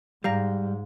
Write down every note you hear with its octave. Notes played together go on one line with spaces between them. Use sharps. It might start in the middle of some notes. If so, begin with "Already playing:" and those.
G#2 G3 F5 A#5 A#6